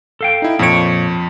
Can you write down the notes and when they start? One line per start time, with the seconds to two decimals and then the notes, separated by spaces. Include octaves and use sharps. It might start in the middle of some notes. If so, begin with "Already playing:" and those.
0.21 A4 F5 G5
0.42 D#4 E4
0.59 F2 A#2 F3 C#5 D7